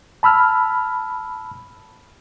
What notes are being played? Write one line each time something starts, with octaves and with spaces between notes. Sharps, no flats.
A5 B5 E6 F6